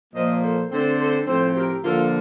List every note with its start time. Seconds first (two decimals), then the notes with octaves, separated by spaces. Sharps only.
0.14 A#2 F3 A#3 C5 D#5
0.42 A4 C5
0.70 D3 A3 C4 A4 C5
0.99 A4 C5
1.27 A2 F3 C4 A4 C5
1.55 G4 A#4
1.83 D3 F3 A#3 F4 A4